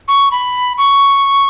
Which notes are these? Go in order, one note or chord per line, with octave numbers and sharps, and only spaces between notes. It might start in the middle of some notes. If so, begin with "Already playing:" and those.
C#6
B5
C#6